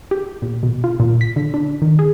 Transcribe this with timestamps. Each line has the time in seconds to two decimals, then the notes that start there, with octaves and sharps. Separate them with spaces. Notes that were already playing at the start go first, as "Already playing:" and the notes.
0.11 G4
0.42 A#2
0.63 B2
0.84 F4
1.00 A#2
1.21 B6
1.36 D3
1.54 D4
1.82 D#3
1.99 G#4